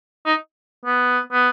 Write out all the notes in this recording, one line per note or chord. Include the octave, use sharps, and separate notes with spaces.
D#4
B3
B3